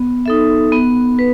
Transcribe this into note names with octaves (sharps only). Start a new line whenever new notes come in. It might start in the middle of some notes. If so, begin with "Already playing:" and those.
Already playing: B3
D#4 A4 E5
B3
B4